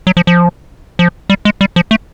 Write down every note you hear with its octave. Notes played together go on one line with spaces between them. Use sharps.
F#3
F3
F3
F3
G3
G#3
G3
F3
A3